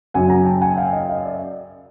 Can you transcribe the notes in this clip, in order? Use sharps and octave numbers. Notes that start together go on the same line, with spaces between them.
F#2 C#3 F#3 F#5 G#5
G#5 A#5
G5 A5
F#5 G#5
F5 G5
D#5 F5
D#5 F5
D5 E5